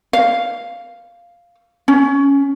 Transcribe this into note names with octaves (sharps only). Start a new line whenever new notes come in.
F5
C#4